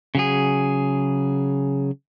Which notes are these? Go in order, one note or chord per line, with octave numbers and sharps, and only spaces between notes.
C#3 F#3 G#4